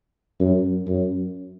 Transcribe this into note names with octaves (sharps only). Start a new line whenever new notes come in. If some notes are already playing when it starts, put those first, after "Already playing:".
F#2
F#2